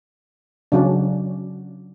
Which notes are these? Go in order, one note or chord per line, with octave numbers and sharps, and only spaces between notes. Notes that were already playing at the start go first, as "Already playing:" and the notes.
C#3 F#3 C#4 D4